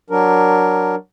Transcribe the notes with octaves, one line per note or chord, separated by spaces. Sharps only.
F#3 D4 A#4